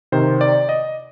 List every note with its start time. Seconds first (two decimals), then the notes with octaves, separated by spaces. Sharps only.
0.12 C3 D#3 C5
0.41 D5
0.69 D#5